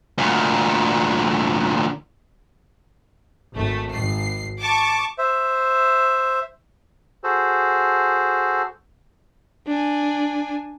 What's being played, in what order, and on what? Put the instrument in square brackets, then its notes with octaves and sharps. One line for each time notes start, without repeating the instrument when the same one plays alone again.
[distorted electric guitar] D2 A#2
[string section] G#1 A3
G#1 C7
A5 C#6 D6
[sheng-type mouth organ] C5 E5
[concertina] F#4 G#4 A4 C5
[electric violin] D4 G#5